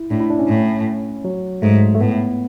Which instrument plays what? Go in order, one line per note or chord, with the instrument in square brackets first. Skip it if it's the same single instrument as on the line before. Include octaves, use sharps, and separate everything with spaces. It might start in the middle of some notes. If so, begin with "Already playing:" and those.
Already playing: [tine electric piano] E4
[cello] A2 [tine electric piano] D4
[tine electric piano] E4
D4
C#4
[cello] A2
[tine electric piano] F#3
[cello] G#2 [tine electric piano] A3
[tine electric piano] A3
[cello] A2 [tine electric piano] B3